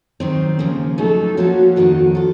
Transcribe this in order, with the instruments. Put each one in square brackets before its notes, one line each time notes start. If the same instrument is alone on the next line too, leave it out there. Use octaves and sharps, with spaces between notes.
[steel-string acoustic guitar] D#3 F#3 C4 D#4
D#2 C#3 F3 A#3
[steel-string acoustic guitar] F#3 A3 D#4 [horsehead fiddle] A4
[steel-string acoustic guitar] F3 A#3 C#4 F4 [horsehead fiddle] F#4
[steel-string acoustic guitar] F2 D#3 A#3 D#4 [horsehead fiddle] F#4
[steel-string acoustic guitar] F4 A4